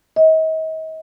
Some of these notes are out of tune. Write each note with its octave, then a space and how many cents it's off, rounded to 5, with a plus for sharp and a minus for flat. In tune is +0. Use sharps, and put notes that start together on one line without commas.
D#5 +40